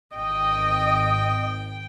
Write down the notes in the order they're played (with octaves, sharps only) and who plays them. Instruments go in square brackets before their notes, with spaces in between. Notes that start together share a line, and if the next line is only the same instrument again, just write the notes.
[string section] G#1 G5 [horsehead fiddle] D#5